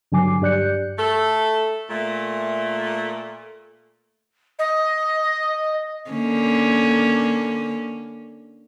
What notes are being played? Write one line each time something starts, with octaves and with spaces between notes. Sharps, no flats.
G2 D3 F#3 G#5 D6 C7
G2 G4 D5 F#6 G6 C#7
A3 A4
A#2 A3
D#5
D3 A#3 C#4